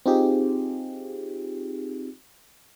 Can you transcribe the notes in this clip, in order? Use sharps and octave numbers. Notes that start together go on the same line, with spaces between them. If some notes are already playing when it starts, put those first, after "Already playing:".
C4 D#4 F4 G4 G#4